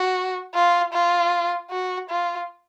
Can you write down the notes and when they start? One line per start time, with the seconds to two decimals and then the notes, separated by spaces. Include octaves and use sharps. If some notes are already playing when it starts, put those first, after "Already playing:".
Already playing: F#4
0.55 F4
0.93 F4
1.71 F#4
2.10 F4